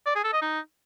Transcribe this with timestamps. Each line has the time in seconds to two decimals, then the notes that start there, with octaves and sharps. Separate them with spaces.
0.06 D5
0.15 G#4
0.24 A4
0.33 D#5
0.42 D#4